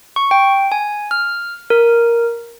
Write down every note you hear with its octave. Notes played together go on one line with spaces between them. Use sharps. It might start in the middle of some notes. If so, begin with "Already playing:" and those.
C#6
G5
G#5
F6
A#4